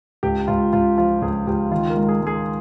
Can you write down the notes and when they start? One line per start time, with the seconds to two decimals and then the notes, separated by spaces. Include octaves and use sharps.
0.23 C#2 G4
0.48 C#2 F4
0.73 C#2 F4
0.97 F3 F4
1.22 C#2 G#4
1.47 C#2 G4
1.71 D#3 F4
1.90 A#4
1.96 G#3
2.08 G#4
2.21 G#3
2.27 G#4